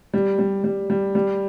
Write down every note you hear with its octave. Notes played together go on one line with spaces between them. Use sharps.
G3
G3
G3
G3
G3